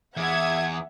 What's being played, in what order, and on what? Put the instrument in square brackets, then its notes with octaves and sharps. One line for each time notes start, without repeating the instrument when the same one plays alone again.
[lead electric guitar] E2 [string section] E5 F#5 G#6